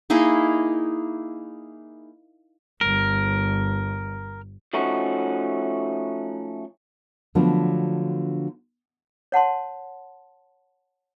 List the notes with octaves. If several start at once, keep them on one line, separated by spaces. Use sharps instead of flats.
A#3 D#4 E4 G#4
G1 A#4
F3 A3 C#4 D#4 F#4
D3 F3 F#3 A3 B3 D4
C#5 F#5 A5 C6